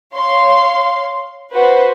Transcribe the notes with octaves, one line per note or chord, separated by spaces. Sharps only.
C#5 F5 C6
F#4 B4 C5